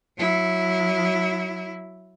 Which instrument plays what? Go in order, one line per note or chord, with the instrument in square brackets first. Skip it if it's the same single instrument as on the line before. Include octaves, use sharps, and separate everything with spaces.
[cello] F#3 E4